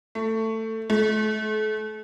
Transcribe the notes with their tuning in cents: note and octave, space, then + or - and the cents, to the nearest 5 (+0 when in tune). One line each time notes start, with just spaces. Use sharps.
A3 +15
A3 -35